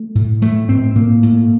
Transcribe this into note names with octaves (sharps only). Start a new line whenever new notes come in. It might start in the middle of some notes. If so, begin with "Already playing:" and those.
Already playing: A3
A2
A2 A3
A2 C4
A2 A#3
A2